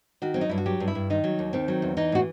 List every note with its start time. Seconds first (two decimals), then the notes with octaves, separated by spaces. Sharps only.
0.22 D#3 F#4
0.34 F#3 C4
0.41 D#4
0.49 G2 E4
0.58 F#4
0.66 F#3 G4
0.80 G2
0.88 E4
0.95 G2
1.10 D#3 D#4
1.24 F#3
1.39 D#2
1.53 D#3 C4
1.68 F#3
1.82 E2
1.97 E3 D#4
2.12 A2 F#4